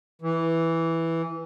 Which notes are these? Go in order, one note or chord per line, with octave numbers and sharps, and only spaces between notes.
E3